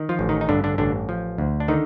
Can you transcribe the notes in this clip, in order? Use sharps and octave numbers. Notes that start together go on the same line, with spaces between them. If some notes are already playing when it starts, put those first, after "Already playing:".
Already playing: D#3
F3 F4
A1
D#3 D#4
D#4
G2 D3 D4
D3 D4
A1 D3 D4
F3
D2
D4
D3 D#3 D#4